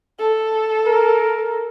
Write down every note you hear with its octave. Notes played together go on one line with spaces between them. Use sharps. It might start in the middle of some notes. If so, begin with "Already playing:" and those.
A4
A#4